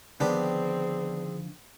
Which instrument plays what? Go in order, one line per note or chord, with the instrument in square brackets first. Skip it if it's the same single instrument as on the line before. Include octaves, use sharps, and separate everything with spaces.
[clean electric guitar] D3 D#3 F3 [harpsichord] B3 D4 G4 [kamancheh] C4 [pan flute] G#4